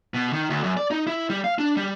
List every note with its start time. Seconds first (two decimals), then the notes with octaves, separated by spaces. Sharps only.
0.14 B2
0.33 D#3
0.50 D2
0.63 F#2
0.77 D5
0.91 D#4
1.07 E4
1.30 G3
1.44 F5
1.59 D4
1.77 G3